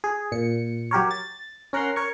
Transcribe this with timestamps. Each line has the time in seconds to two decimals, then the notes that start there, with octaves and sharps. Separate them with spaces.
0.04 G#4
0.32 A#2 C#7
0.91 F#3 G4 A#4 C#5
1.11 A6
1.73 C#4 A#4 F#5 A#5 C6
1.96 A#4 C#5 C#6